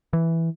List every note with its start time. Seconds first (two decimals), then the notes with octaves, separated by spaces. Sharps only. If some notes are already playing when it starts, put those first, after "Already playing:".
0.13 E3